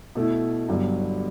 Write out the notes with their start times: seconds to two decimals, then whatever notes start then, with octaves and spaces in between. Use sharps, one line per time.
0.15 B2 A3 E4
0.69 G1 G2 F#3